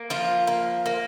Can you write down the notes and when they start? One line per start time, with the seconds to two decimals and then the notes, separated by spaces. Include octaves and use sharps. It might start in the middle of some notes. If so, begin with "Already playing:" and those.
Already playing: A#3
0.10 F3 F4
0.47 A#3
0.86 A#3